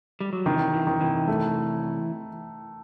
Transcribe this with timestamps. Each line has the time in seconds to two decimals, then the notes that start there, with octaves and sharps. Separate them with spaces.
0.21 G3
0.33 F#3
0.46 C3 D#3 E3
0.74 C3 E3
0.87 D#3
1.01 C3 E3
1.27 A3